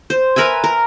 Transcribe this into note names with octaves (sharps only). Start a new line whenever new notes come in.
C5
A#4 B4 E5 G#5
A#4